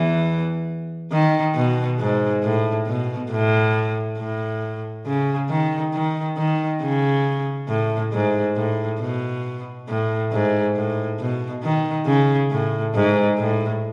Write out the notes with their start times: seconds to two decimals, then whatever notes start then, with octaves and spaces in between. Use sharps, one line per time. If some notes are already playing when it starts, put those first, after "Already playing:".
Already playing: E2 E3
1.12 D#3
1.55 B2
2.00 G#2
2.43 A2
2.87 B2
3.31 A2
4.18 A2
5.06 C#3
5.49 D#3
5.94 D#3
6.37 D#3
6.82 C#3
7.69 A2
8.12 G#2
8.56 A2
9.00 B2
9.88 A2
10.32 G#2
10.76 A2
11.19 B2
11.64 D#3
12.07 C#3
12.51 A2
12.95 G#2
13.38 A2